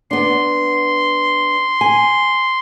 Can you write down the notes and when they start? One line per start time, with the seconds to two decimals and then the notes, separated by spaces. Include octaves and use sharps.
0.11 B3 D4 C6
1.81 G#5